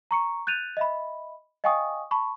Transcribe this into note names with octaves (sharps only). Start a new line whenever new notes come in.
A#5 C#6 C#7
F#6 G6 A6 D#7 F7
D#5 E5 B5
D#5 F5 G5 G#5 C#6 D#6
A5 B5 C#6